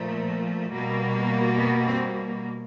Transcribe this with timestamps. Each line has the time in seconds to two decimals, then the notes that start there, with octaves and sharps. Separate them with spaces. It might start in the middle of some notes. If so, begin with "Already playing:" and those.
Already playing: A#2 F3 A3
0.72 B2 G3 A#3
1.58 B3
1.87 C4